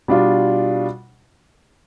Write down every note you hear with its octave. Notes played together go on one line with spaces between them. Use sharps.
B2 G3 D4 F4